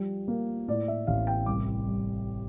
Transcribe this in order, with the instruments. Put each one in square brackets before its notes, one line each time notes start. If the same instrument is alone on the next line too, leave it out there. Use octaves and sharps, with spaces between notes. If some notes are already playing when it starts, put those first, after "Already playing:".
Already playing: [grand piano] F3 G3
A#3
A2 D5
E5
A1 F5
G5
C2 D6
G3